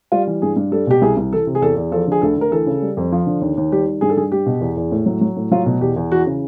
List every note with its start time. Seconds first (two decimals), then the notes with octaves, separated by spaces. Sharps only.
0.12 G3 F4
0.27 E3
0.42 G2 G#4
0.57 G2
0.72 G3 A4
0.87 B2 G4
1.02 C2 G#4
1.17 C2
1.32 E3 A4
1.47 C3
1.55 G#4
1.62 E2 A4
1.77 E2
1.92 F3 A4
2.07 D3 G#4
2.22 D2 A4
2.37 D2 A#4
2.51 E3 A4
2.67 C#3
2.82 G3
2.97 F2
3.12 F3
3.27 D3
3.41 D#2
3.57 D#2
3.72 G3 G4
3.86 D#3
4.01 G2 G#4
4.10 A4
4.17 G2 G#4
4.32 G3 G4
4.46 B2
4.61 E2
4.77 E2
4.92 A2
5.06 F#3
5.21 F#3
5.37 A2
5.51 F#3 F4
5.66 B2
5.81 E2 G4
5.96 E2
6.11 E3 F#4
6.26 C#3